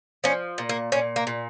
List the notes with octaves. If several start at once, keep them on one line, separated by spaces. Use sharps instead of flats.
F3 C#4
A#2
A#3
A#2 C#4
A#3
A#2